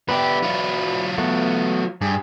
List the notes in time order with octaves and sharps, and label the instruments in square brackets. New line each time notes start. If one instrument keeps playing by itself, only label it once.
[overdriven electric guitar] B3 G4 [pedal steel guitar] B4 D5 E5
[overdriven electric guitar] F#3 F4
[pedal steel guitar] A3 B3 F#4
[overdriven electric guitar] G2 [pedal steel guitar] G#4